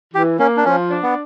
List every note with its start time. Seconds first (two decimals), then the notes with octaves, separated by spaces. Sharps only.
0.15 E3 G4
0.39 A#3 C#4
0.57 D4
0.65 F3 C#4
0.91 D4
1.03 B3